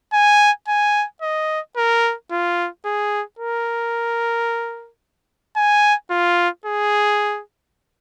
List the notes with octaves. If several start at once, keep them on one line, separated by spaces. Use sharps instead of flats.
G#5
G#5
D#5
A#4
F4
G#4
A#4
G#5
F4
G#4